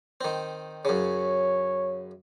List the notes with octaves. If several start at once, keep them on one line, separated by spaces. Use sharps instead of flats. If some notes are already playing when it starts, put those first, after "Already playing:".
D#3 C4
F#2 C#3 C#5